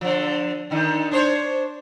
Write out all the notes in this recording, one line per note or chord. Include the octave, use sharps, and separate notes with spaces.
D3 F3
D3 D#3 D#4
D4 C5 C#5